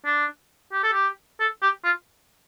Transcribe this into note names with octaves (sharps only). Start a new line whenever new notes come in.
D4
G4
A4
G4
A4
G4
F4